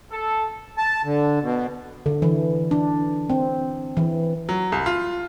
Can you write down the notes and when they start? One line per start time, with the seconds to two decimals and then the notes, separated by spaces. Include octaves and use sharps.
0.11 A4
0.78 A5
1.05 D3
1.42 B2
2.06 D3
2.22 E3
2.71 D4
3.30 C4
3.97 E3
4.49 F#3
4.72 C2
4.86 F4